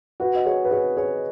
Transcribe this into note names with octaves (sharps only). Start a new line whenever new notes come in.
F#4 B4
D#5
G#4 C#5
B4
G#4 C#5
G#4 C#5